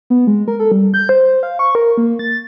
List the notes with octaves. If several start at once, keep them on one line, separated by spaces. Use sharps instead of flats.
B3
G#3
A#4
A4
G3
G6
C5
F5
C#6
A#4
A#3
A6